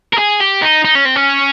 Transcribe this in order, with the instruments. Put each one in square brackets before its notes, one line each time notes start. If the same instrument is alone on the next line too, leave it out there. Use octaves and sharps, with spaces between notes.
[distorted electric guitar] A#4
G#4
G4
D#4
D#4
C#4
C4
C#4